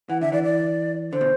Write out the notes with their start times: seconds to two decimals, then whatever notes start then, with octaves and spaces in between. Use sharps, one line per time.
0.10 E3 F#5
0.22 D3 E5
0.32 E3 D5
0.44 D5
1.13 D3 C5
1.21 B2